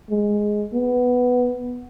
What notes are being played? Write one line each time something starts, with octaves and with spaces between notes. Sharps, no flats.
G#3
B3